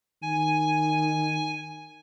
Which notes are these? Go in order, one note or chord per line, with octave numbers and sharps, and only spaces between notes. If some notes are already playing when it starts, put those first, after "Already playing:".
D#3 G#5